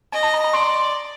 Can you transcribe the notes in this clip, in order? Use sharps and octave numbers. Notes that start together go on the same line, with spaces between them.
D#5 G#5
A5
A#5
A#5
D5 C6